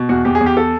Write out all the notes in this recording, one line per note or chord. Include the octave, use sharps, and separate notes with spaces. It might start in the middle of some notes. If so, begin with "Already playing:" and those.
Already playing: B2
E2 F#4
E2 G4
G#4
E2
G4
A4